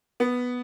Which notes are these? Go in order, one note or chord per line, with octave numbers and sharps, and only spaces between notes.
B3